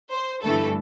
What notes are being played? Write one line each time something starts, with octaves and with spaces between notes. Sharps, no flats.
C5
G1 G2 E3 A3 A4